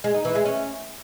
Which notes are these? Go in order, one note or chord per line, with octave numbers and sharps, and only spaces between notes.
G#3
D#4
E3
G#3
C#4